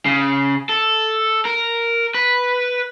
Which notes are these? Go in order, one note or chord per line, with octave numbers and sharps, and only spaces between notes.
C#3
A4
A#4
B4